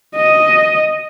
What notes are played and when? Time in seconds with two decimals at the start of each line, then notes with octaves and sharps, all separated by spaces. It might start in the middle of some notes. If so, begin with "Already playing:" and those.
0.16 D#5